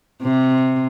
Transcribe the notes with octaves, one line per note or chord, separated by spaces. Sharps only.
C3